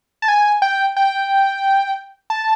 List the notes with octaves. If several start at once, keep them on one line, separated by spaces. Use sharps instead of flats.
A5
G#5
G5
G5
A5